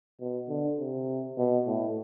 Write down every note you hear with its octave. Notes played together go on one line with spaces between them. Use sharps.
B2
D3
C3
B2
A2